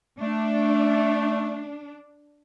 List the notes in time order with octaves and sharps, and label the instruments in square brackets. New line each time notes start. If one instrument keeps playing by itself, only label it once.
[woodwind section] A3 [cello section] D4